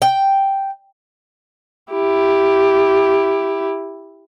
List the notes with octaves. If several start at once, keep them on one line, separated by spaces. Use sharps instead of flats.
G5
E4 G4